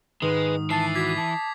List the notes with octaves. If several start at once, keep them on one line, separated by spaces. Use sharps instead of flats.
G#2 D#3 G#3 B4 D#6
E3 A5 A6 C7
F#4 D6 G#6 B6
A5